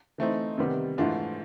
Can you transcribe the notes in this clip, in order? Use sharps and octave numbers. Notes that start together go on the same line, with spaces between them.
E3 A3 C4 D#4
C3 D#3 G3 B3
G#2 E3 A3 D4 F4